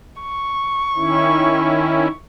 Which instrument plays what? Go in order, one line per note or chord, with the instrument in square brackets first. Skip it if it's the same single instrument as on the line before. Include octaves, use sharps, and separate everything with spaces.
[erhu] C#6
[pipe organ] D#3 C#4 E4